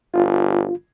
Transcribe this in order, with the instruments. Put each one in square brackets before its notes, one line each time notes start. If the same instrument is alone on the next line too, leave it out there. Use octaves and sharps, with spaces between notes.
[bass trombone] G1 [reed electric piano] F4